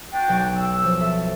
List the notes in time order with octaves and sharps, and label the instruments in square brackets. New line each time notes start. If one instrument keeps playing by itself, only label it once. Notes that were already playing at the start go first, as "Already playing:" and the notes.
[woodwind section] D4 F#4 G5
[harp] B1
[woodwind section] E6
[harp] F3
A4 E5